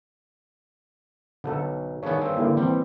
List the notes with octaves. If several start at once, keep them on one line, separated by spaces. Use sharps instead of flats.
B1 D3 A4
G2 D#3 B3 G#4 C#5
G2 C4
D3 A#3 E4 G4
E3 G3 C4